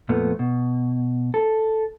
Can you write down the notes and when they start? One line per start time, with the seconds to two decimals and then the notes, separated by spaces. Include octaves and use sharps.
0.09 F2 A#2 F3 A3 B3
0.39 B2
1.34 A4